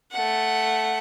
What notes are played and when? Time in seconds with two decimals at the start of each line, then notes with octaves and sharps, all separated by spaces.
0.12 A3 F#5